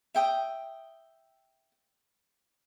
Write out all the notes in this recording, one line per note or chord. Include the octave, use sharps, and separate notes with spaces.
E5 G5 D#6